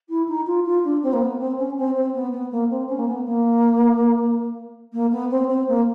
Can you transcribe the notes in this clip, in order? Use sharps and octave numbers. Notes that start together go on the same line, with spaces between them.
E4
D#4
F4
F4
D4
C4
A#3
B3
C4
C#4
C4
C4
B3
B3
A#3
C4
C#4
A#3
B3
A#3
A#3
B3
C4
C4
A#3